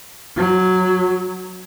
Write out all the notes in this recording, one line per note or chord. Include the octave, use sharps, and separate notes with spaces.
F#3